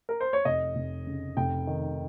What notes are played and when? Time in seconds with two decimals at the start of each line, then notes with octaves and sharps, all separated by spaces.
0.09 A#4
0.20 C5
0.33 C#5
0.45 F1 D#5
0.76 F1
1.06 C#3
1.37 F1 G5
1.67 D#3